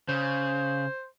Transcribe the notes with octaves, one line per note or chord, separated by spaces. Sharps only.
C#3 C5